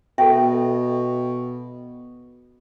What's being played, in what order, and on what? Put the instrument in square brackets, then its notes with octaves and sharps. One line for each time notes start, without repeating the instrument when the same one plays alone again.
[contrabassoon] B2 [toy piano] A4 E5 [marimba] G5